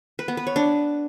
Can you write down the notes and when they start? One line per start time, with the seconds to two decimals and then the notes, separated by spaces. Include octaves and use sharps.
0.19 B4
0.28 B3
0.37 B4
0.47 C#5
0.56 D4